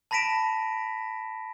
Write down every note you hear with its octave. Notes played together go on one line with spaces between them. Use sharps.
A5 B5 A#6 B6 D7 E7